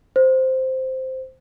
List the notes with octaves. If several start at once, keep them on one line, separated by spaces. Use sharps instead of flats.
C5